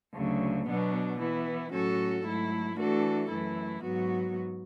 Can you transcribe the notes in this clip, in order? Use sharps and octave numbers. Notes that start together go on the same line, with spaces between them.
D2 C#3 F#3
B2 F#3 B3 D4
E3 B3 E4
A2 F#3 C#4 F#4 A4
G#2 F#3 A3 E4
E3 A3 D4 F#4 A4
F#2 E3 A3 E4
G#2 F#3 B3 F#4